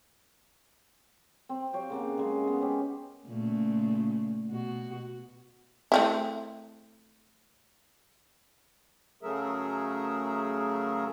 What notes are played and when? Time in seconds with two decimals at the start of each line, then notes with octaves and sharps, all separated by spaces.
1.49 C4
1.73 G4 C#5 F5 G5
1.90 C#3 A#3 F#5
2.18 C#3 G#3
2.44 G#3 B3
2.61 C#4 G4
3.27 A#2 C#3 A3
4.48 B2 F#4
5.92 A3 C4 E4
9.23 C#3 F#3 A3 G#4 A#4 E5